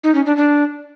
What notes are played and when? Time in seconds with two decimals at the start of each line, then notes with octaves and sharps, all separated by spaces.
0.04 D#4
0.15 C#4
0.26 D4
0.37 D4